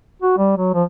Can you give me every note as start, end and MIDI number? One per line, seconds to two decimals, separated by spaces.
0.22 0.36 66
0.38 0.54 55
0.57 0.71 54
0.74 0.84 53